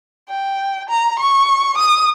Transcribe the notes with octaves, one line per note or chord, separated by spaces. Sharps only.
G5
A#5
C#6
D#6